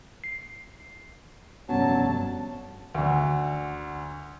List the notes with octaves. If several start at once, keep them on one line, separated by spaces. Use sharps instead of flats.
C7
F1 G2 F#3 B3 C#4 A5
D2 D3